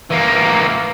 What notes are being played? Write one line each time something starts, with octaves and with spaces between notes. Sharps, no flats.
E3 A#3